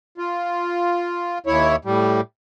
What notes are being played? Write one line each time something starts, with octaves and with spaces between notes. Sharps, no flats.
F4
D#2 E4 C#5
A2 G3